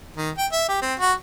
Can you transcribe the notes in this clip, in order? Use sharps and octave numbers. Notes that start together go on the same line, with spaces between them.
D#3
G5
E5
G4
C4
F#4